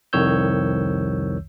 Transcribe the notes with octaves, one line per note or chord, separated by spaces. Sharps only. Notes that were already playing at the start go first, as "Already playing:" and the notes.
C2 F2 D#3 C#5 E6 G6